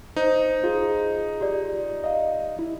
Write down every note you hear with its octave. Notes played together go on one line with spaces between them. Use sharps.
D#4 C5
F4 G#4
G4 D5
D#5 F5
E4